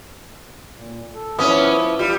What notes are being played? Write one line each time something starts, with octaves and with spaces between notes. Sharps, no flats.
A#2
A4
F3 B3 C#4 E4 D6 D#6
G3 F4